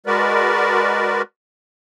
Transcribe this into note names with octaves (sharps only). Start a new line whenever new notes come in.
G#3 F#4 A#4 B4 D5